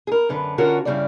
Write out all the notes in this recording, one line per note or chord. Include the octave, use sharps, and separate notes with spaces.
G#4 A#4
F#2 D3 B4
D3 C#4 F4 F#4 A#4
G2 A#2 C#3 G3 E4 D5